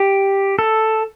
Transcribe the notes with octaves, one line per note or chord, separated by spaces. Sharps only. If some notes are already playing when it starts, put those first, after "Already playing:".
Already playing: G4
A4